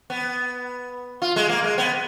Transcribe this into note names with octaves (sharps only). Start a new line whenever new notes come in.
B3
F4
G#3
A#3
G#3
B3